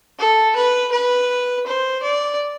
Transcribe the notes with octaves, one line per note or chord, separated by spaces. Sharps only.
A4
B4
B4
C5
D5